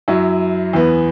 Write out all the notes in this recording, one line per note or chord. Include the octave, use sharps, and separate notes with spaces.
F#2 F#3 E4
E2 E3 B3